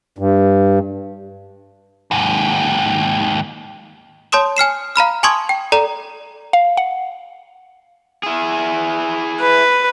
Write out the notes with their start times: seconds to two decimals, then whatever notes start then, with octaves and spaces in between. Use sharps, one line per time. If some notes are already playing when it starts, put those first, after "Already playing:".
0.18 G2
2.11 D#2 G#2
4.32 C#5 A5 C6 D#6 E7
4.57 G#5 F6 C7 E7
4.96 F5 A#5 B5 F6
5.23 G#5 A5 C6 C#6 D#6 G#6
5.49 G5
5.72 A4 D5 A#5
6.53 F5
6.77 F#5
8.23 E4 G#4
9.41 B4